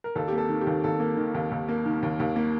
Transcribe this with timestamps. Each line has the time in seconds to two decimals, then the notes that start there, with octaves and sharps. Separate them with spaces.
0.04 A#4
0.15 D#2 A4
0.28 A#3 G4
0.38 A4
0.49 D#3
0.61 G4
0.67 D#2
0.84 D#2 A4
1.00 A#3
1.17 D#3
1.34 D#2
1.51 D#2
1.68 A#3
1.85 D#3
2.03 D#2
2.20 D#2
2.36 A#3